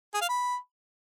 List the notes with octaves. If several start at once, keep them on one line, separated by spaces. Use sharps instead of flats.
G#4
F5
B5